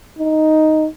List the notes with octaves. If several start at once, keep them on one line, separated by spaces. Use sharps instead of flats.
D#4